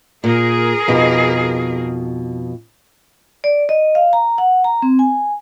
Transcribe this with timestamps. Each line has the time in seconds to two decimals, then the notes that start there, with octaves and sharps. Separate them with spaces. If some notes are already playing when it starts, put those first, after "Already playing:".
0.24 A#2 G#4 A#4
0.88 F2 B2 D#4
3.44 D5
3.69 D#5
3.95 F5
4.13 A#5
4.38 F#5
4.64 A#5
4.82 C4
4.99 G#5